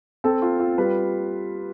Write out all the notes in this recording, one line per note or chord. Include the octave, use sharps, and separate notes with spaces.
C4 A4
F4
F4
G3 B4